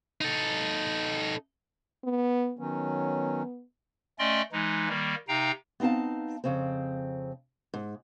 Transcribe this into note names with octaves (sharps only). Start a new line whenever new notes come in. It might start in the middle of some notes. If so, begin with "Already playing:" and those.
D#4 A4
B3
D#3 F#3 B3 C#4
A3 C#4 D5 D#5 G5 C6
E3 G#3 D#4
D#3 G3 A#3
C3 D#4 F5 G5 A#5
B3 C4 D#4 F5 A5
F2 C#3 C4
G#2